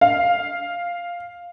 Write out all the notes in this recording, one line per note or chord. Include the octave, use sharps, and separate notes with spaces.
F5